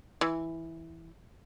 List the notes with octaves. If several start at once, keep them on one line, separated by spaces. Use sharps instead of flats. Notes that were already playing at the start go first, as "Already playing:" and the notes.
E3